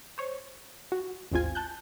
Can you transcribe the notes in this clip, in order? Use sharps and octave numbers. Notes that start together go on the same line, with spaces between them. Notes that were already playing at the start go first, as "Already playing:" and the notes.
C5 C#5
F#4
A1 D#2 G#2 C4 F4 G#5
A5 F#6 G6